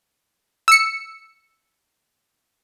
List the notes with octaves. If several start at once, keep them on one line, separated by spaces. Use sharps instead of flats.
E6 C#7